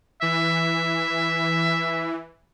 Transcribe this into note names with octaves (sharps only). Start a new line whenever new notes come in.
E3 E5